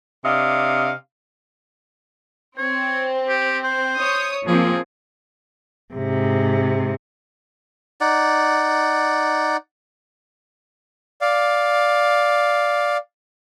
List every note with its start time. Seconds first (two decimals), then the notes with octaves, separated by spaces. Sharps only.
0.24 C3 D4 D#5 F5
2.58 C4 C#5
3.29 G4
3.64 C5
4.00 C#5 D#6
4.47 F3 A#3 C4 G#4
5.94 G#2 C3
8.01 D#4 D5 F#5
11.21 D5 F5